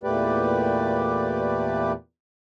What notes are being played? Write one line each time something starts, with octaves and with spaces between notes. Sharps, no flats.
E2 A#2 A3 G4 B4 D5